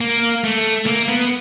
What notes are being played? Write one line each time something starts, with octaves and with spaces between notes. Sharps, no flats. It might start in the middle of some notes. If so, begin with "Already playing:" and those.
A#3
A3
A#3
B3